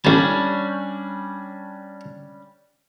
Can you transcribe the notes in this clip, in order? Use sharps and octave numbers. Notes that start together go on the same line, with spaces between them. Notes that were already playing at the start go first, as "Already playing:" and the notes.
A1 G3 C#4 D4 A5